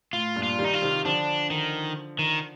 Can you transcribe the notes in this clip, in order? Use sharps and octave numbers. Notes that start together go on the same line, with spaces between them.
A2 F4
G2 A#2
F4
D#3 G3
D#4
F4
C3 D#3
D3 F3 D4
D#3
D#3